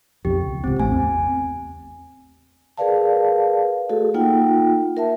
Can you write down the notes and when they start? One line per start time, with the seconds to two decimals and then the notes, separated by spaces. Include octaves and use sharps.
0.25 B1 F2 G4
0.42 C#2
0.64 G#1 C#2 C4
0.80 A1 A3 G#5
0.91 E2 C4
2.78 G#4 A#4 B4 D5 F5 A5
3.90 A3 F#4 G#4 A4
4.14 A#3 D#4 F4 F#5 G5
4.97 A#4 E5 A5